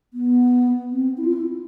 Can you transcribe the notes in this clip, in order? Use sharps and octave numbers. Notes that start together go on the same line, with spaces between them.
B3
C4
E4
F4
E4